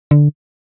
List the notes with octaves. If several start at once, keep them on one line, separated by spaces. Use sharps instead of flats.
D3